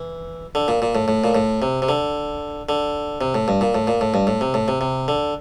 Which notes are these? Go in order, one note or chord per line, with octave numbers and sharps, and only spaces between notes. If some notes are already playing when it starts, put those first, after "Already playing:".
Already playing: E3
D3
A#2
A#2
A2
A2
A#2
A2
C3
C3
D3
D3
C3
A2
G2
A#2
A2
A#2
A2
G2
A2
C3
A2
C3
C3
D3